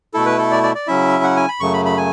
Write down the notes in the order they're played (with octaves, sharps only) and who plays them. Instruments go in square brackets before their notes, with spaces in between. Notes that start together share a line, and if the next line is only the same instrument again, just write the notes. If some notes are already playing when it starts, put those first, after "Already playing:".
[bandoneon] B2 A3 E4 A4
B4
A4
D5
D5
D5
C#3 F#3 C#4 E4 E5
F#5
G#5
B5
F#2 C#3 F#3 A3 C#6
B5
B5
G#5